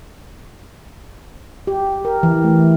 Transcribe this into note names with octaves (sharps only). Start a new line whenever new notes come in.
G4
A#4
E3
A3